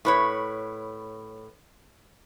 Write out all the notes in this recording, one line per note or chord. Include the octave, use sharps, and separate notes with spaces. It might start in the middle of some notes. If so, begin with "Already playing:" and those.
A2 B4 C#5